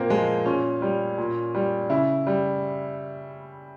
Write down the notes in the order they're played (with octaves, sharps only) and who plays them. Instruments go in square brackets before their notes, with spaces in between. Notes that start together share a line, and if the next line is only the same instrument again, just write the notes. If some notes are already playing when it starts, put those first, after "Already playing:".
Already playing: [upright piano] A#2 A#3 C4
F3 G#3
A#2 C#4
G3
A#2
G3
C#3 E4
G3